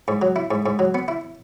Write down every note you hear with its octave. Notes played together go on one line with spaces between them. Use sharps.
G#2
F#3
E4
G#2
G#2
F#3
B3
E4